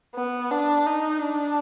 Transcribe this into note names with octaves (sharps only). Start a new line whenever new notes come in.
B3
D4
D#4
D4